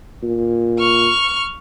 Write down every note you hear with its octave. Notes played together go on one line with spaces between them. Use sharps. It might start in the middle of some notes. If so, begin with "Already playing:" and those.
A#2
C#6 F6